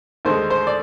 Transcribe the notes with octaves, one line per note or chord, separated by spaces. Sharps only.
D#2 D3 G#3 C5
C5
D5